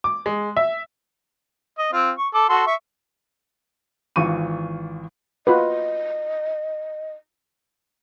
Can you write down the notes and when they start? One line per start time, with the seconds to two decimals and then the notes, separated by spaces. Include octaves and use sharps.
0.04 D6
0.26 G#3
0.57 E5
1.79 D#5
1.93 C4 F4
2.18 C#6
2.34 A4 D6
2.50 F#4 A4 C6
2.67 E5 C#6
4.16 G#1 E3 F4 C#6 D#7
5.47 F4 F#4 B4 D#5